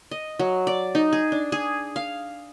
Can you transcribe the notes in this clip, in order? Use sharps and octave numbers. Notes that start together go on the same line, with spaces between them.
D#5
F#3
D5
D#4
G#4
D4
G#4
F5